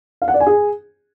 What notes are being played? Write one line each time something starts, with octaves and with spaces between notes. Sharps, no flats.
F5
F#5
D5
G#5
G#4